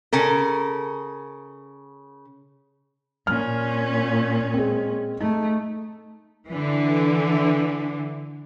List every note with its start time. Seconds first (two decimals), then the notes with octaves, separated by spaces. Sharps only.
0.13 C#3 A4 A#4
3.27 A#2 C#4 F6
4.54 G#3 C4
5.20 A3 D#4
6.47 D3 E3